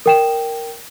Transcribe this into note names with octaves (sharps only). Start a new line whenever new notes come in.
A#4 G5 E7